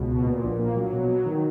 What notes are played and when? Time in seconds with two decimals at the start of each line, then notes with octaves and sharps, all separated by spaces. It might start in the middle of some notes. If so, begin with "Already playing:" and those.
Already playing: C#2 B2
0.11 B2
0.26 A#2
0.43 A#1
0.59 A#3
0.76 F#3
0.92 B2
1.08 F#3
1.25 D#3